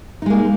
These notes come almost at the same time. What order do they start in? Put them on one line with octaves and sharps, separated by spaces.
D#4 G#3 A#3